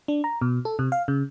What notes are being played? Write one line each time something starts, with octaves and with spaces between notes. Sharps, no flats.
D4
A#5
B2
A4
C3
F5
C#3